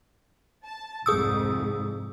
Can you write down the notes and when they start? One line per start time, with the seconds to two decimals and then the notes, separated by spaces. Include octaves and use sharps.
0.64 A5
1.06 C2 F2 G#2 G#4 D#6 E6